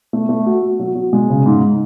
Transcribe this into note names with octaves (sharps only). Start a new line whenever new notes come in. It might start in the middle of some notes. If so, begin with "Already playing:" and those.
A3
A3
F#4
F#4
F#3
F#3
G#3
C#3
G#2